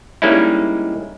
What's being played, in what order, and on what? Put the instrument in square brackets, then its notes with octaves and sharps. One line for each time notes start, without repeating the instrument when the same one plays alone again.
[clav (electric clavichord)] G3 G#3 A#3 C#4 D#4 E4